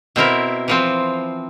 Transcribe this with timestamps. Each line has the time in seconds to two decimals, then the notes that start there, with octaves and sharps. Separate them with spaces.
0.16 B2 C4 E4 A#4
0.68 E3 F3 C4